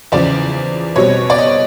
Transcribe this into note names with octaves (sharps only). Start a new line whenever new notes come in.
E2 C#3 F3 D5
B2 G3 C4 C#5
D5
D#5